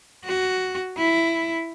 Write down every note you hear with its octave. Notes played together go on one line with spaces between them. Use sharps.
F#4
E4